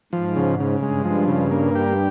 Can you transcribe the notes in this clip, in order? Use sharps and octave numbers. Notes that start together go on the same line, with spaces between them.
G#2 F3
C#3
C#3
G2 G#3
F3
C#3
A#3
G4